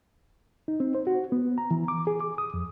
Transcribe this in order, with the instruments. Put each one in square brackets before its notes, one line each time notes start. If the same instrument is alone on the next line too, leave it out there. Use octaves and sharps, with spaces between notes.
[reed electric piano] D#4
C4
C5
F#4
B3
A#5
E3
D6
G#4
D6
D#6
F2